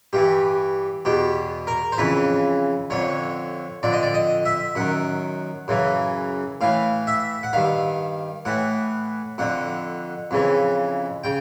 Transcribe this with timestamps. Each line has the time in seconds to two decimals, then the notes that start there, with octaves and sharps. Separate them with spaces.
0.13 G2 E3 G4
1.05 E2 B2 G4
1.67 A#4
1.92 C5
1.98 F2 C#3 E3 B4
2.90 F2 D3 C#5
3.83 F2 D3 D5
3.93 D#5
4.03 D5
4.14 D#5
4.45 E5
4.75 F#2 D#3 F#5
5.68 F#2 C#3 E3
6.61 A2 E3 F5
7.07 E5
7.43 F#5
7.53 G2 D#3 F5
8.45 A2 E3 F#5
9.38 F2 D3 F#5
10.31 F2 C#3 E3
11.24 C#3 G5